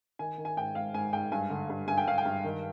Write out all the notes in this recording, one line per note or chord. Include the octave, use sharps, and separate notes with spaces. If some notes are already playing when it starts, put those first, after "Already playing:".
D#3 G#5
D#3
G#5
G#2 G5
G#2 F5
G#2 G#5
G#2 G5
G2 G#5
D3
G2
G2 G#5
G5
G2 F5
G5
G2
D#3